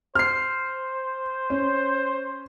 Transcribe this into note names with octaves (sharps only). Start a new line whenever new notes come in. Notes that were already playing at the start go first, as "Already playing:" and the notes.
C5 F6 C7
C#4